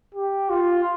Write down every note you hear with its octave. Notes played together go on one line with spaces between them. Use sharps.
G4
F4